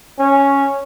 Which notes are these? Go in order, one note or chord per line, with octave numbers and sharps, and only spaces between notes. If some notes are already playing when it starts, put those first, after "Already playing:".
C#4